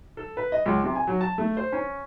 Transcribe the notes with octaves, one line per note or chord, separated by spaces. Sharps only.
A4
B4
D#5
C#2
C3
G#5
F#3
A5
A3
C5
C#4